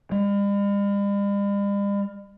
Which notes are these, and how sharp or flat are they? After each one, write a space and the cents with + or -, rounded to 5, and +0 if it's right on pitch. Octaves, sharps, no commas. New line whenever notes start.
G3 +45